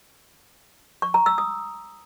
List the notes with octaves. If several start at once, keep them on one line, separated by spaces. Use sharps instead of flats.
C#6
A#5
E6
D#6